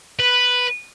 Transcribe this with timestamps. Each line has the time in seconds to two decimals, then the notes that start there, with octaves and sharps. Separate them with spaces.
0.19 B4